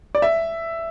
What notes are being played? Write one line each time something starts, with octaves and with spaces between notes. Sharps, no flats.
D5
E5